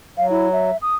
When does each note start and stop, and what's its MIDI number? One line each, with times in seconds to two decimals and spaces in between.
0.17 0.71 54
0.17 0.28 77
0.30 0.51 64
0.53 0.77 76
0.82 0.96 87